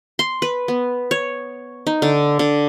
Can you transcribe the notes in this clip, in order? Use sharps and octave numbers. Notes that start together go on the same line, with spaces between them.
C6
B4
B3
C#5
D#4
D3
D3